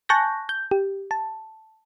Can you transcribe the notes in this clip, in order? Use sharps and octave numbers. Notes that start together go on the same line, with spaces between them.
G#5 A5 C#6 F#6 G6 A#6
G6
G4
A5